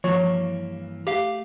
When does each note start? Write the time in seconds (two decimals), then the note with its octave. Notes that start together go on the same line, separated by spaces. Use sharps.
0.04 G2 E3 F3 A#3 C#5
1.07 A3 G4 F5